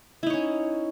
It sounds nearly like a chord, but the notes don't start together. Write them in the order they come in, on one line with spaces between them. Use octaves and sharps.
E4 D#4 C#5 C#4